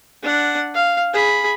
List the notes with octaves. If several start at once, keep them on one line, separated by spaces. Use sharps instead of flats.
D4 F#5
F5
G#4 B5